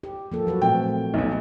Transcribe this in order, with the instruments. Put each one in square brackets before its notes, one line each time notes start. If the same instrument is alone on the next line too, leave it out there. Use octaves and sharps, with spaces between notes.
[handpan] G4
F3 A#3 A4
F#3 F#4 B4
[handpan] A#2 A3 C4 [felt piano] G5
[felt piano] B1 B2